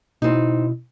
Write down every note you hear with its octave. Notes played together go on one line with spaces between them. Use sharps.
B2 C4 D#4 E4